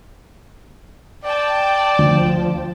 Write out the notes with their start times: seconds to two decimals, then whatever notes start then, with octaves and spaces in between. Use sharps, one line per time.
1.24 D5 G5 A5
1.99 D2 F3